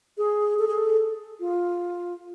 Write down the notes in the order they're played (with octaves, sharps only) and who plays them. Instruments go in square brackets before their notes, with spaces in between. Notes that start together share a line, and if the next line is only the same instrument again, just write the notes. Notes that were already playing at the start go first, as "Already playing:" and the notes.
[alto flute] G#4
A4
G#4
A4
F4